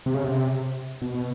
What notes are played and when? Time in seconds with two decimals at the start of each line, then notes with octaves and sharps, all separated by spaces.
0.06 C3
0.14 C#3
0.25 C3
1.02 B2